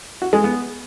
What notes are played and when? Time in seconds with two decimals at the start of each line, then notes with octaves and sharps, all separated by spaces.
0.22 F#4
0.33 G#3
0.44 B3